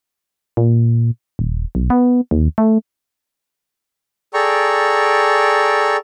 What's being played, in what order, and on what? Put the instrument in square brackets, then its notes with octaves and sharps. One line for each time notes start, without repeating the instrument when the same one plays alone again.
[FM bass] A#2
D#1
B1
B3
D#2
A3
[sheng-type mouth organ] G#4 A4 D5 G5 A#5 C#6